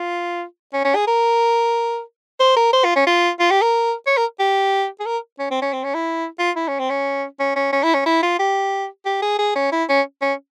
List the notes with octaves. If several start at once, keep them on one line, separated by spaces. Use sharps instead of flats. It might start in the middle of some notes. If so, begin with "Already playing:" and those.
Already playing: F4
C#4
C#4
G#4
A#4
C5
A#4
C5
F4
C#4
F4
F4
G4
A#4
C#5
A#4
G4
G#4
A#4
C#4
C4
C#4
C4
C#4
E4
F4
E4
C#4
C4
C#4
C#4
C#4
C#4
E4
C#4
E4
F4
G4
G4
G#4
G#4
C#4
E4
C#4
C#4